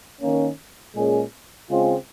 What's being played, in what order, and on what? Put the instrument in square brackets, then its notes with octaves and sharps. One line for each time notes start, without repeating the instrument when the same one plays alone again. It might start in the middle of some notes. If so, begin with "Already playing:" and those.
[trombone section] D#3 A#3 C#4
A#2 G#3 C#4 G#4
C#3 G#3 C4 F4 G#4